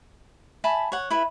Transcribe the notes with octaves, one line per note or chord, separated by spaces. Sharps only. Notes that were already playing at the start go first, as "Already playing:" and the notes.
E5 G#5 A5 B5
C#5 F#5
E4 B4 E5